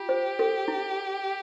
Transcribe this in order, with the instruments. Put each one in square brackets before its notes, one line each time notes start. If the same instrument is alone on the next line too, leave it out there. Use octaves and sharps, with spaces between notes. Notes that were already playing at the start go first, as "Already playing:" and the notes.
Already playing: [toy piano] F4 [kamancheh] G4
[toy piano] C5
A4
E4